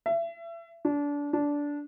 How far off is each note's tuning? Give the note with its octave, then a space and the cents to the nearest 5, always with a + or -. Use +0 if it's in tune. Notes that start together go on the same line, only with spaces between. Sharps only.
E5 +30
D4 -25
D4 -15